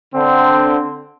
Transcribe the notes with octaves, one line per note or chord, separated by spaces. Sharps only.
D3 C4